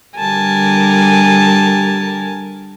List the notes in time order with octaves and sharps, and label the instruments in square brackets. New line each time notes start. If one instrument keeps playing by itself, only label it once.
[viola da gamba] D3 G3 A#4 [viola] G#5 A5